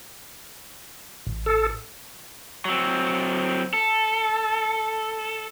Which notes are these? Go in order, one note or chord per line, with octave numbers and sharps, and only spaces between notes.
A1
A4
F#3 C4
A4